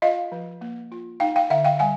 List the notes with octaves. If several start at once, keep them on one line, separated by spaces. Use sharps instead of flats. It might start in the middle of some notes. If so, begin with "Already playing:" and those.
F4 D#5 F5
F3
A#3
F4
D#4 F5 G5
F5 G5
D3 E5 F#5
F5 G5
G3 F#5 G#5